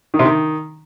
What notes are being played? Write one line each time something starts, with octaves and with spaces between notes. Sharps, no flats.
D#3
C3
D#3